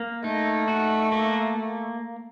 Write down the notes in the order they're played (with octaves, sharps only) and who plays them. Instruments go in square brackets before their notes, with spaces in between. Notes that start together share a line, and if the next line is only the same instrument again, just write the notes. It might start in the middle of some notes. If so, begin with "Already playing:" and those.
Already playing: [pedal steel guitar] A#3
[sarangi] A3 [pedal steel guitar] D#4
[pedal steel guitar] F#4
A#3